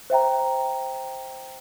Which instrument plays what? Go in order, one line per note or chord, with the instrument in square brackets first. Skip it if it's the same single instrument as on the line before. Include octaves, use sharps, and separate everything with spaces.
[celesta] C5 E5 G5 A#5